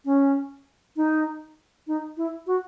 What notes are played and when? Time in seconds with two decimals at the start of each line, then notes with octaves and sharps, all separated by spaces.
0.05 C#4
0.96 D#4
1.87 D#4
2.17 E4
2.47 F#4